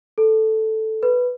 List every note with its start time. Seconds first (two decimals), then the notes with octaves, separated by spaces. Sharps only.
0.18 A4
1.03 B4